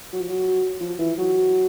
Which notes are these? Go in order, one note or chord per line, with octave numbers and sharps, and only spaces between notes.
F#3
F3
F#3
F3
E3
F#3